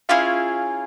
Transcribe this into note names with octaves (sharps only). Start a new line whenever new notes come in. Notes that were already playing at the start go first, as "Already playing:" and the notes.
C#4 E4 F4 G#4 F5